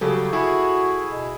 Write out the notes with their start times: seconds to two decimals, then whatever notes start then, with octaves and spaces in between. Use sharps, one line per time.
0.01 C#3 F#3 G3 A4
0.33 E4 F#4 G#4
1.07 B2